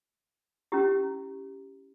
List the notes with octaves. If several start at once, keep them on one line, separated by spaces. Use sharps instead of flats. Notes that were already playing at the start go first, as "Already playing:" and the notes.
C#4 E4 G4